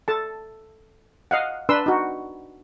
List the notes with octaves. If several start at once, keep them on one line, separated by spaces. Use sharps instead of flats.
A4 A5
D#5 F5 F#5
D4 B4 C6 E6
D#4 F#4